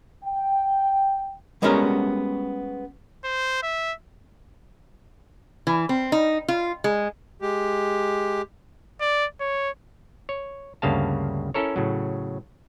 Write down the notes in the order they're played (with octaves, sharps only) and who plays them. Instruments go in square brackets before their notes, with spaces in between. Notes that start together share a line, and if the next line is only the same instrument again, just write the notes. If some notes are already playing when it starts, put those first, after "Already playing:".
[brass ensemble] G5
[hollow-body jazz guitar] G3 G#3 B3 C#4 F#4 A#4
[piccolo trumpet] C5
E5
[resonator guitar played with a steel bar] E3
C4
D#4
F4
G#3
[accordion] G#3 G4
[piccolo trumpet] D5
C#5
[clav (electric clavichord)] C#5
D2 G2 C#3 A#3 F5 A5
C#4 E4 A4 A#4 C#5
A2 C#3 F#3